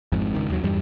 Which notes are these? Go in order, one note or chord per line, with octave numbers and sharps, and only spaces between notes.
G#1 F2 G#2
C#2 D#3
D#2 F#3
E2 G2 G3